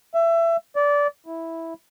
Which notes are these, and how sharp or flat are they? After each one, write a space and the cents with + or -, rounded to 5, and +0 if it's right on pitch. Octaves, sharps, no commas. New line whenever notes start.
E5 +25
D5 -20
E4 -5